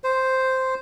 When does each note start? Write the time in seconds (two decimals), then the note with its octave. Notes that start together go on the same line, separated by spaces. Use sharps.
0.04 C5